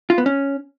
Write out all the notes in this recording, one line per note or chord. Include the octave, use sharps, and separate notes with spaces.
F4
B3
C#4